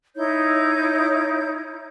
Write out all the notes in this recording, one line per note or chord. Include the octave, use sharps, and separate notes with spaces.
D#4 E4 C#5 G6